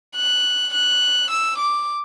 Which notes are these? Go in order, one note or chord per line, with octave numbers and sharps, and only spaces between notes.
F#6
F#6
E6
D6